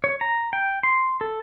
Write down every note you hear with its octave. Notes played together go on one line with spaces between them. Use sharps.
C#5
A#5
G5
C6
A4